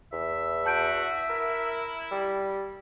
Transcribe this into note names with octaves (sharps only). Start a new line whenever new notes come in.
E2 E5
F#4 A5 G6 D7
E4 A#4
G3